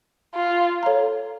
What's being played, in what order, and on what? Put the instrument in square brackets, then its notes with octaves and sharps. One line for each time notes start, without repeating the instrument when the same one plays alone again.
[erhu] F4
[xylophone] A4 C#5 F5 A#5